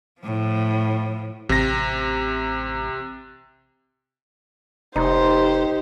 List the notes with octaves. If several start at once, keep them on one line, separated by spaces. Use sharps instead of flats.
A2 F3
A1 C3 A#6
F1 D#4 G4 C5